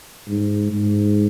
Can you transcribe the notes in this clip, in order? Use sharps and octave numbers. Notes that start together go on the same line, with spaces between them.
G#2
G#2